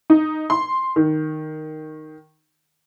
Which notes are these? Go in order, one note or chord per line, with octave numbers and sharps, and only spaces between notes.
D#4
C6
D#3